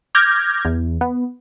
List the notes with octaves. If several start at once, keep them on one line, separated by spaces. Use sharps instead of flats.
D6 F6 G6 G#6 A#6
E2
B3